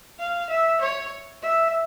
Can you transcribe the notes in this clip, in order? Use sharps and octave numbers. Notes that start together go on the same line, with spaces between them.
F5
E5
C#5
E5